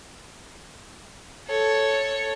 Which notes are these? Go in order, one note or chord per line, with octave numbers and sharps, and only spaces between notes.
A4 C#5